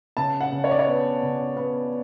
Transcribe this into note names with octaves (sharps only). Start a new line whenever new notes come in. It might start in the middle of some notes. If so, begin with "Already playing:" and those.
C#3 A5
F#5
C#3
C#5
D5
C#5
B3
C#3
B3